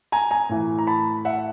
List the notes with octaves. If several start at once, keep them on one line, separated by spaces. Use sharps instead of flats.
G#5 A#5
G#5 A#5
A2 E3
A#5
A5 B5
E5 F#5